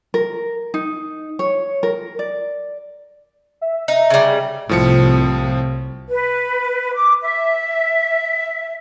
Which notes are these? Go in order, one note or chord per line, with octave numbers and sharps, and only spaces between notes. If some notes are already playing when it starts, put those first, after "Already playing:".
A#4
D#4
C#5
A#4
D5
E5
D#4
C#3 G3
C2 A2 F3 C#7
B4
D6
E5